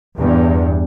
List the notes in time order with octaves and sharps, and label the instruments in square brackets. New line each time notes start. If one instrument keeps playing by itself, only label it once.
[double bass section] E2 G2